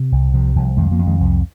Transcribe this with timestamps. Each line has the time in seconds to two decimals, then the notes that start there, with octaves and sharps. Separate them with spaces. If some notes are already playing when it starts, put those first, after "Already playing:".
Already playing: C3
0.12 C2
0.34 C3 F3
0.56 C2 F3
0.77 F2 D#3 G#3
0.92 F3 A#3
0.99 F2
1.06 D#3 G#3
1.20 C2 F3